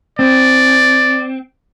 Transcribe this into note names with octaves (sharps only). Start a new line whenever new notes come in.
C4 D5